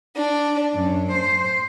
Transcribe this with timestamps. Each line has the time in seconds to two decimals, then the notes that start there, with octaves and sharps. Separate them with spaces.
0.15 D4
0.74 F#2
1.13 C5